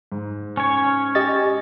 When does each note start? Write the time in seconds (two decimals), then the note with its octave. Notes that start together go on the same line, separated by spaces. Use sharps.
0.12 G#2
0.57 C#4 C#5
1.15 G4 D#5 A6